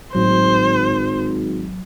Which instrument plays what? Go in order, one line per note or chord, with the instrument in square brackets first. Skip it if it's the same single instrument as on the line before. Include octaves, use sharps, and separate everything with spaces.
[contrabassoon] G#1 [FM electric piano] A2 F#3 [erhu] C5